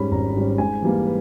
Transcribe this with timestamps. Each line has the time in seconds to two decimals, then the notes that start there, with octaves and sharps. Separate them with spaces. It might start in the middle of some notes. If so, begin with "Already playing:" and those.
Already playing: G#2 G3 C#4 B5
0.11 G#1 A#5
0.36 G#2 G3 C#4
0.58 G#2 G#5
0.82 E3 G3 A#3
1.05 B4